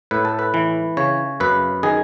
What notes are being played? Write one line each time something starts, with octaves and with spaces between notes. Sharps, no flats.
A2 B4
A4
B4
E3
C#3 C#5
F#2 B4
D#3 G#4